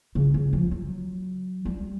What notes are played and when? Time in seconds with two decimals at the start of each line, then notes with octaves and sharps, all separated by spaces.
0.15 C#3
0.34 C#3
0.53 F3
0.71 F#3
1.65 G3